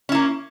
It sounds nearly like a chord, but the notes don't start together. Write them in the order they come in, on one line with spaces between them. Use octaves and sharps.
C#4 E4 A#3